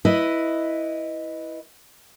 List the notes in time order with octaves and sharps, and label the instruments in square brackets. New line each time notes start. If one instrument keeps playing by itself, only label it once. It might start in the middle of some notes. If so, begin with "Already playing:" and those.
[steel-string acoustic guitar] E4 B4 D#5